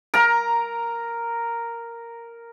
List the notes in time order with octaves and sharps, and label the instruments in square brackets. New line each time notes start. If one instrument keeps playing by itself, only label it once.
[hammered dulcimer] A#4 A#5